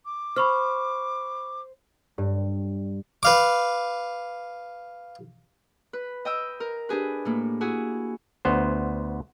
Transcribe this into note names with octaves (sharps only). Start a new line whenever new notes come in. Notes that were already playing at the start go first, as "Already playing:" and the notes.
D6
C5 B5 C#6 F6
G2
B4 F5 D6
B4
D#5 G5 E6
A#4
D4 G4 G#4 B4
A2 A3 A#3
E4 F#4 G#4
D2 B3 C5